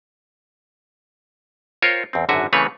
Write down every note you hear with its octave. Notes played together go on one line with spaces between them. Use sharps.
F4 A#4 C5 C#5 G5
E2 C4
G#1 F#2 D3 F#4 E5 G#5
C#3 E3 A3 C4 B4 C#5